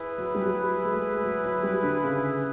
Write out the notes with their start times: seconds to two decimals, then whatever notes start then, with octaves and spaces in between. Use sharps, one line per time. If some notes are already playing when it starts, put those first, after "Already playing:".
Already playing: E4 G#4 B4
0.18 F#3
0.35 G3
0.45 F#3
0.84 G#3
0.93 A3
1.01 G#3
1.23 F#3
1.44 F#3
1.63 G3
1.83 D3
2.03 C#3